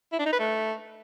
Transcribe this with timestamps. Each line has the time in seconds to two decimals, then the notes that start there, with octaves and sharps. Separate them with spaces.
0.12 E4
0.19 D4
0.26 D#4
0.33 B4
0.39 A3